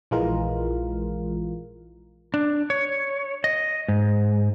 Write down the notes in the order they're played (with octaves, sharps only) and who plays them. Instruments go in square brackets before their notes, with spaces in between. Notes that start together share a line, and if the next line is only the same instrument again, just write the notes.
[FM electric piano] A#1 E3 G#3 F4 A#4
[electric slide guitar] D4
C#5
D#5
G#2